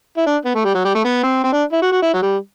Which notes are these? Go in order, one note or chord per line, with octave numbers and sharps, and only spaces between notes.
E4
D4
B3
A3
G3
F#3
G3
A3
B3
C4
C4
D4
E4
F#4
F#4
E4
F#3
G3